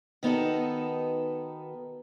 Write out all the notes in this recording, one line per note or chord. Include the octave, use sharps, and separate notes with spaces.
D#3 B3 D#4 F#4 A4